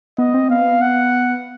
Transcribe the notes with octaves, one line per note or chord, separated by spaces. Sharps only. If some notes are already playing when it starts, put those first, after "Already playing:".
B3 D#5
C4
B3 F5
F#5